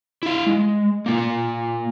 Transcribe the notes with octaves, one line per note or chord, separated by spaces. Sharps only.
E4 F5
G#3
A#3 F4